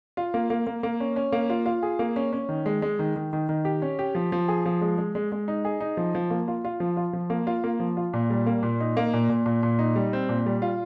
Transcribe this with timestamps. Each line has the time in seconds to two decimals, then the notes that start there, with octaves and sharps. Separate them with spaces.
0.17 F4
0.34 A#3
0.50 A#3
0.67 A#3
0.83 A#3
1.00 C#4
1.16 C#4
1.32 A#3
1.50 F4
1.66 F4
1.83 G#4
1.99 A#3
2.16 C#4
2.33 C#4
2.49 D#3
2.66 G#3
2.82 G#3
2.99 D#3
3.16 D#3
3.33 D#3
3.49 D#3
3.65 G4
3.82 C#4
3.99 G4
4.15 F3
4.32 F3
4.48 G#4
4.65 F3
4.81 G#3
4.98 G#3
5.15 G#3
5.32 G#3
5.48 D#4
5.65 G#4
5.80 D#4
5.97 F3
6.15 F3
6.30 A#3
6.48 F4
6.65 F4
6.80 F3
6.97 F4
7.13 F3
7.30 A#3
7.47 F4
7.64 A#3
7.80 F3
7.97 F4
8.13 A#2
8.30 G3
8.46 A#3
8.63 A#2
8.80 D#4
8.97 A#3
9.13 A#2
9.29 A#2
9.46 A#2
9.63 A#2
9.79 D#4
9.96 G3
10.13 C4
10.29 A#2
10.46 G3
10.62 F4